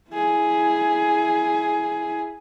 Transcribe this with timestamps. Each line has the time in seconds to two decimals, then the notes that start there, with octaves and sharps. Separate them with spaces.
0.10 E4 G#4